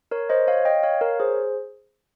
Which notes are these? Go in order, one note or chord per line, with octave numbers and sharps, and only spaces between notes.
A#4 C#5
C5 D#5
C#5 F5
D#5 G5
C#5 F5
A#4 C#5
G#4 C5